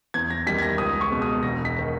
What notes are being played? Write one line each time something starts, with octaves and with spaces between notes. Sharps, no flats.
E2 G#6
A#6
D#3 G3 B6
G#6
A#6
C#2 D#6
C#6
B2 G#3
D#6
E1 A#6
B6
D#3